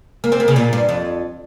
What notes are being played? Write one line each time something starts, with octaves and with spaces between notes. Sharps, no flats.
A#3
C4
A#3
C#3
A#2
G2
F2